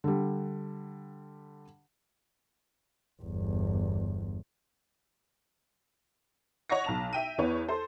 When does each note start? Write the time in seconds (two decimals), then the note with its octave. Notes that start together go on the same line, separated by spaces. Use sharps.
0.04 D3 G3
3.23 G1 E2
6.70 C#5 D#5 F#5 C#6 A#6
6.84 B1 A5 F7
7.13 E5 G5 D#7
7.38 E2 B3 C#5
7.68 A4 C5